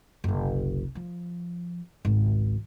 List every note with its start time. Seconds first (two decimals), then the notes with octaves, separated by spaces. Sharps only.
0.24 F#1 C2
0.95 F3
2.05 G#1 C#2